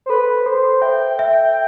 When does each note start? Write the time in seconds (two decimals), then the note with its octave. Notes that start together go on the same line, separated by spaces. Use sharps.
0.06 C5
0.09 A4 B4
0.46 A4 C5
0.82 E5 G5
1.19 E5